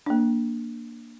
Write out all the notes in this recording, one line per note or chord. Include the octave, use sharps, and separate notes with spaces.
A#3 D4